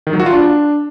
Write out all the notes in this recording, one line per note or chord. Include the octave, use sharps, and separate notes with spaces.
D#3
F#3
F#4
F4
D4